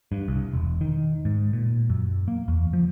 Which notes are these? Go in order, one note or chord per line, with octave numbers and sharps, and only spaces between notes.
G2
C2
E1
D#3
G#2
A#2
F#2
A#3
E2
F3